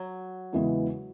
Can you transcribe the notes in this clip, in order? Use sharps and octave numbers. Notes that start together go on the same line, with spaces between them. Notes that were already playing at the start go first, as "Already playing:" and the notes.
Already playing: F#3
E2 C#3 E3 G#3 C#4